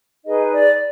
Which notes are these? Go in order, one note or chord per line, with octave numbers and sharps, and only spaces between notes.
D#4 G#4 B4 D#5
D5